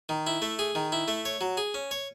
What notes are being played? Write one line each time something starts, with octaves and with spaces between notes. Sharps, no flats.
D#3
E4
A3
G#4
D#3
E4
A3
C#5
F#3
G#4
C#4
C#5